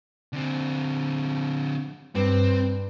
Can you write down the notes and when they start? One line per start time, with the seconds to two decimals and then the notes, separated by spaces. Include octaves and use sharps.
0.33 D3 C4
2.15 G2 C4